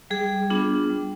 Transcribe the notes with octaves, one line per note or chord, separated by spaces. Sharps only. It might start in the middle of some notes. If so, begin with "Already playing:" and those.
G3 G#4
B3 D4 F4
G3